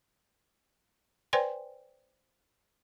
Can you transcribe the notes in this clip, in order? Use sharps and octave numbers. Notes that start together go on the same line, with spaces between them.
B4 C5 D5 G5 G#5 C6